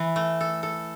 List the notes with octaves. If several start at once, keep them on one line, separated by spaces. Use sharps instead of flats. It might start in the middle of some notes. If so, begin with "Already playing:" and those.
Already playing: E3 E4
A3
A4
A4